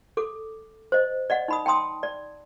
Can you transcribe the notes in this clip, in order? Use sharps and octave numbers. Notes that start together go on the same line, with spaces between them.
A4 D6
C5 D#5
D5 D#5 F#5
D#4 B5 D#6
G5 A5 C6 D#6
D5